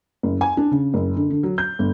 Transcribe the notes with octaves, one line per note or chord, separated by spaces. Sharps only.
F#1
G#5
D4
C#3
F#1
D3
D3
F#3
G6
G1